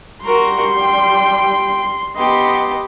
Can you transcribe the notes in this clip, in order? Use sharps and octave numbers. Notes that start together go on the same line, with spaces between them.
G3 F#4 A#4 C6
G5
B3 G4 D#5 C6